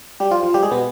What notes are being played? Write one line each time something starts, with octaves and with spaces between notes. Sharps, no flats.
G3 G4
F3 F4
F3 F4
G3 G4
G#3 G#4
B2 B3